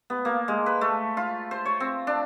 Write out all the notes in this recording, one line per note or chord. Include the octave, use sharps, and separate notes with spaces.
B3
A#3
G#3
B4
A3
F4
C5
C#5
C4
D4